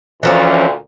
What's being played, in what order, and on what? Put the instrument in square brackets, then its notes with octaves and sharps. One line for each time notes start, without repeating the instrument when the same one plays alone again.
[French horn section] D2 A#2 [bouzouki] E3 F3 C#4